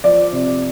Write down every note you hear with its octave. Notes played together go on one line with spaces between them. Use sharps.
F3 D5
C3